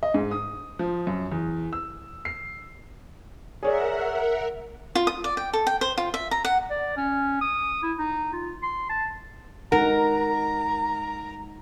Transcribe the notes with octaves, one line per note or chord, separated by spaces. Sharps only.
D#5
G#2
D#6
F3
F#2
E2
E6
C7
G#4 A#4 C#5 D5 E5 F#5
F4
D#6
D5
G5
A4
G5
C5
F4
E5
A#5
F#5
D5
C#4
D#6
E4
D#4
F4
C6
A5
G#3 D#4 A#4 F#5 A#5